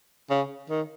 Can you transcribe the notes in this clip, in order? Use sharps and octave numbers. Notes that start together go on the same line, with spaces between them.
C#3
D#3